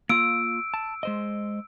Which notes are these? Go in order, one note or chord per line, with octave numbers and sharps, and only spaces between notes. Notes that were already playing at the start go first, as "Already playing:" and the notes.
A#3 F4 E6 D7
A5
G#3 C5 D#5